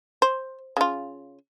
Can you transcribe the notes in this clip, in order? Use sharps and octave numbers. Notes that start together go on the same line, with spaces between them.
C5
C#3 F4